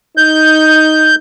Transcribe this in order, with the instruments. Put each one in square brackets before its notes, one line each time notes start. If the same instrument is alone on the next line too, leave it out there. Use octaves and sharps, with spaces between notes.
[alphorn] D#4 [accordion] G6